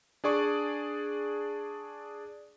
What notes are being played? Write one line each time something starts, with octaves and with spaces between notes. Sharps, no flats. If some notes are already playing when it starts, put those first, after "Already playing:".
D4 G#4 D5 C#6